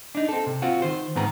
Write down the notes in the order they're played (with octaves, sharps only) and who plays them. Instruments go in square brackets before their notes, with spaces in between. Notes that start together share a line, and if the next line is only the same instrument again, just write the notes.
[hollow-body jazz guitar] D4 D#4
C4 A4
C3
C4 F4 F#4
D#3 C5
G#2 D#3 B3 C4 A#5